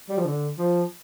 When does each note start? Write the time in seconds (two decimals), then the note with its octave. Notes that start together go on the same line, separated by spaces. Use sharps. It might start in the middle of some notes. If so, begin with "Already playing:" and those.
0.09 G3
0.18 F3
0.25 D3
0.58 F3